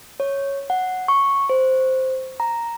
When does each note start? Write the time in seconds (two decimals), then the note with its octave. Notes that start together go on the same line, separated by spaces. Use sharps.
0.20 C#5
0.70 F#5
1.08 C#6
1.50 C5
2.40 A#5